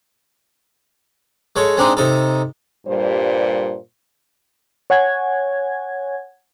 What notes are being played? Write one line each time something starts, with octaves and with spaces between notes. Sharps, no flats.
G#3 A4 C#5
G#3 C4 D4 D#4
C3 D#4 A4
G2 A#2 G3 C5
C#5 F#5 G#5 G#6